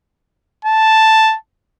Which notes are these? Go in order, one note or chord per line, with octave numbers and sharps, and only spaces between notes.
A5